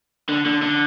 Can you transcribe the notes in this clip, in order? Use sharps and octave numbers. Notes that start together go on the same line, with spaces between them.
D3
D3
D3